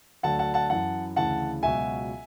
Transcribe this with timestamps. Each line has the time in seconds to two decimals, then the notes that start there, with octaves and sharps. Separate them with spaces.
0.23 D2 D3 F#3 F#5 A5
0.39 F#5 A5
0.54 F#5 A5
0.70 F#2 E3 F#5 A5
1.16 D2 C#3 E3 F#5 A5
1.63 C#2 B2 F#3 E5 G#5